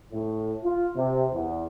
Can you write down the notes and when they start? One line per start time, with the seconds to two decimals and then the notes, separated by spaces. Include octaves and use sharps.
0.12 A2
0.64 F4
0.96 C3
1.32 E2